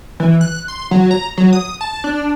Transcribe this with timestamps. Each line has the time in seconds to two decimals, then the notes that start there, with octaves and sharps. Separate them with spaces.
0.20 E3
0.41 F#6
0.68 C6
0.91 F#3
1.11 A#5
1.37 F#3
1.53 D#6
1.81 A5
2.04 D4